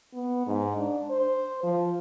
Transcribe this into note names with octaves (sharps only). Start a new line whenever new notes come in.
B3
G#2
D4
C5
F3